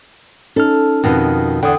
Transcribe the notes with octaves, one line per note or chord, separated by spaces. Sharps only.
C#4 D#4 A4 F6
F2 B2 D#3
E2 D3 G5 D#6